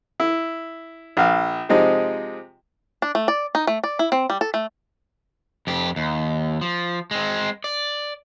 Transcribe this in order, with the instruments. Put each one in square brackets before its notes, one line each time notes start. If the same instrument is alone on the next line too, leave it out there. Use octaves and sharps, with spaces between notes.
[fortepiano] E4
A#1 F5
C3 F3 G#3 D#4
[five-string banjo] D4
A3
D5
D#4
A3
D5
E4
C4
G3
A4
A3
[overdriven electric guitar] F2 G4
D#2
F3
G#3 C4
D5